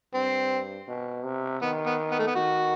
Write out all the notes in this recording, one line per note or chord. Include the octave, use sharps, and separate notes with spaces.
G2 C4
B2
C3
D#3 B3
B3
B3
A3
B3
D#3 F#4